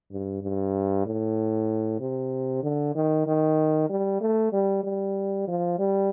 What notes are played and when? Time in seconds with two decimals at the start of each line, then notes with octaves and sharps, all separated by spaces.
0.12 G2
0.43 G2
1.06 A2
2.00 C3
2.63 D3
2.95 D#3
3.27 D#3
3.90 G3
4.21 A3
4.53 G3
4.84 G3
5.48 F3
5.78 G3